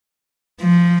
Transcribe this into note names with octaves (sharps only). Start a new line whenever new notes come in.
F3